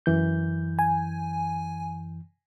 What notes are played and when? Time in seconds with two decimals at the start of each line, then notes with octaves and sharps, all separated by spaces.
0.06 F#2 E3 G6
0.79 G#5